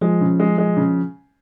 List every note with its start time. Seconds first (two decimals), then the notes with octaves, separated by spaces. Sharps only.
0.01 F3 G#3
0.21 C#3
0.40 G#3
0.58 G#3
0.77 C#3